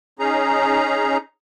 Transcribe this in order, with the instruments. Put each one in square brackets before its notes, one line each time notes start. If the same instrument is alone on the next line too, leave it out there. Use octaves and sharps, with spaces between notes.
[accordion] C#4 D#4 G#4 A#5